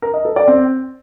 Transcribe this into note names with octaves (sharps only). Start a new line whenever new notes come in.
A#4
D#5
A4
D5
C4